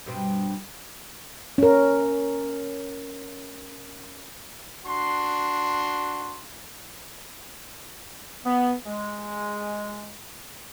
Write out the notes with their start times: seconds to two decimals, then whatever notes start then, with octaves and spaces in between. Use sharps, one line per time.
0.06 G2 B2 C4
1.58 C#4 A#4
4.86 D4 F#4 C6
8.46 B3
8.86 G#3